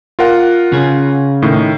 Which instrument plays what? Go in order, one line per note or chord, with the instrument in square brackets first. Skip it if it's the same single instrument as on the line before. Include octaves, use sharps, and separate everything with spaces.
[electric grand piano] F4 A#4 F#5
[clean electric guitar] C#3 G#4
[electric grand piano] A2 D#3